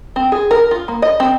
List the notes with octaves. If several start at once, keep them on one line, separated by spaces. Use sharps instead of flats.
C4
G#4
A#4
F4
A#3
D#5
C4